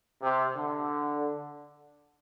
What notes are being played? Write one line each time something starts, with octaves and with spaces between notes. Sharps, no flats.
C3
D3